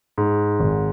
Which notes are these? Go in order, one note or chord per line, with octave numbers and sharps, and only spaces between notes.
G#2
G#1